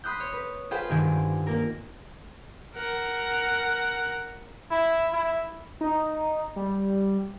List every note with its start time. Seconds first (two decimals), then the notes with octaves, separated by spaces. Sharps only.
0.04 B5 C6 D#6 F#6 G6
0.20 C#5
0.33 B4
0.71 F4 G#4 B4 C5 G5
0.89 G1 G2 D#3 G#5 D7
1.47 A#3 A#4
2.76 A#4 F#5
4.71 E4
5.13 E4
5.81 D#4
6.56 G3